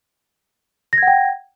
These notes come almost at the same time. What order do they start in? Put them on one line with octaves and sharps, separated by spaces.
A#6 G#6 F#5 G5